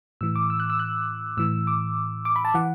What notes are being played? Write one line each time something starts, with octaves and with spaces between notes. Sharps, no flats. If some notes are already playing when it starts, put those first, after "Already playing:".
A2 E3 E6
D6
E6
F#6
E6
F#6
A2 E3 E6
D6
D6
B5
A5
E3 F#5